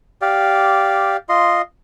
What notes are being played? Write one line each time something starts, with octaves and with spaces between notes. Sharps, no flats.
G4 D5 F5
F4 D#5 C6